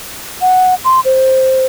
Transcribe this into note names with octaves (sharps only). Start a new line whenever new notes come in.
F#5
C6
C5